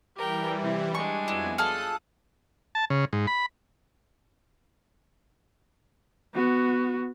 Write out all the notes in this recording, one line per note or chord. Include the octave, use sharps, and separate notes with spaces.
E3 G3 G4 A#4 G5
C3 E4
G3 G#3 D4 G#5 C#6
F2 B3 E4 F#4
F4 G#4 A4 D#6 F#6
A5
C#3
G#2
B5
B3 F#4